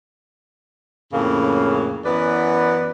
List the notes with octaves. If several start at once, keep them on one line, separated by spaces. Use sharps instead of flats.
F2 A2 C#3 A#3 C#4
F#2 E3 B3 B4 D5